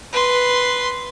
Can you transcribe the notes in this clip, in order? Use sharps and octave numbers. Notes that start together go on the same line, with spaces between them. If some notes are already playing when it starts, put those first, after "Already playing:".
B4 C6